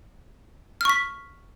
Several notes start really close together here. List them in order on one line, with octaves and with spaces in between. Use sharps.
F6 C#6 B6